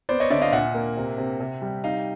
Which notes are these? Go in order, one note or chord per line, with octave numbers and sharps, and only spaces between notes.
B3 C5 D5
C#5 D#5
D3 D5 E5
D#5 F5
A#2 E5 F#5
A#3
C3
C3
C3
G3
D#4 D#5 F5